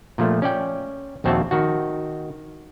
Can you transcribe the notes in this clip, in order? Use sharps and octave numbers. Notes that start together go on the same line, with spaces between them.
A#2 F3 A3
C#4 D5 G5
A#1 D#2 C4 F#4 E5 A5
D#3 F#4